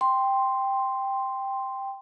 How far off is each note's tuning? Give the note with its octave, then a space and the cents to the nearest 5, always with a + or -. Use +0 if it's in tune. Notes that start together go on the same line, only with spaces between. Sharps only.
G5 +5 C6 +0